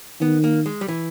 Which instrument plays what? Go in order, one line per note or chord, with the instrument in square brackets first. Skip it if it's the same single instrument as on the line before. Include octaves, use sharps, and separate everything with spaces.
[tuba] D#3 [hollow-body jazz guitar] B3
[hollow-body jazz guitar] A#3
G#3
G3
E3